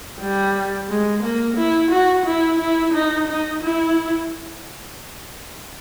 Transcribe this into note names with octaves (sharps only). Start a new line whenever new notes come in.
G3
G#3
A#3
E4
F#4
E4
E4
D#4
D#4
E4